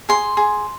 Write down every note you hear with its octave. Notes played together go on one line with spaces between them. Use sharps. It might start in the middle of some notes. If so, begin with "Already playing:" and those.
G#4 C6
G#4